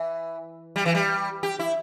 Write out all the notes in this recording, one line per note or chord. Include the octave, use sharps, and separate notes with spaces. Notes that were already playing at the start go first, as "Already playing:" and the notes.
Already playing: E3
G3
E3
G3
G4
E4